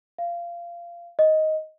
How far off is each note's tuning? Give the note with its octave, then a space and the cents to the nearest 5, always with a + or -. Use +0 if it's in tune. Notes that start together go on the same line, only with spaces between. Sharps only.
F5 -20
D#5 +10